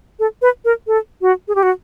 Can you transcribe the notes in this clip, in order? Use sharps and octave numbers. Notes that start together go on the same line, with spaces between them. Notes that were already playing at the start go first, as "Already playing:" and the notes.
A4
B4
A#4
A4
F#4
G#4
G4
F#4